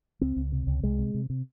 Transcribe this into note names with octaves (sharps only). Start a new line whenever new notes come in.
C#2 C4
C#2
C3
C#2
C2 G#3
C3
C3
C3